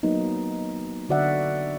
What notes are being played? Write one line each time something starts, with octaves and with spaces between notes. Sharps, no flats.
F#3 A#3 B3 D#4
D3 F#4 D5 E5 F#5